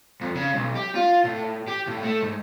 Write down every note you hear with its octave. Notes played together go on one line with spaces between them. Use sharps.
F2
C#3
B1
G4
F4
A2
G4
A2
A3
G#2